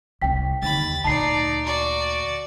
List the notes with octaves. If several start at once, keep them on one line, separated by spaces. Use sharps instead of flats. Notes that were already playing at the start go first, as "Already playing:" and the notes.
C2 C4 G5 B6
D#2 D3 B5 A6
D2 A#2 D#4 D5 A5 C7
F#4 D5